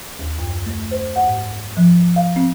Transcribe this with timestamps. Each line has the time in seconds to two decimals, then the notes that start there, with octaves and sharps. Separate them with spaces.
0.19 D#2
0.38 F#2
0.66 A3
0.91 C5
1.16 F#5
1.28 G#2
1.77 F3
2.16 F5
2.36 C4